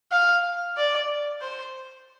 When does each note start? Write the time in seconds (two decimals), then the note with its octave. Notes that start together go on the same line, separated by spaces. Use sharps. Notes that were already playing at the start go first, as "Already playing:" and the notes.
0.12 F5
0.77 D5
1.41 C5